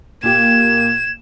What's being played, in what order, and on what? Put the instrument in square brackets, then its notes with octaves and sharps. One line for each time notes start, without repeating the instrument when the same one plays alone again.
[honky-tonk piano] A#2 G4 [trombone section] A#3 [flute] G#6 [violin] E7